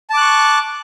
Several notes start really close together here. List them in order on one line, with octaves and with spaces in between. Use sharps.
A5 D6 F#6 C#6